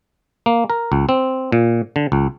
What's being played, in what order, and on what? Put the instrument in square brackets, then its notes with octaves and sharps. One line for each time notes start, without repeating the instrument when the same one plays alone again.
[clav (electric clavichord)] A#3
A#4
C#2
C4
A#2
D3
C#2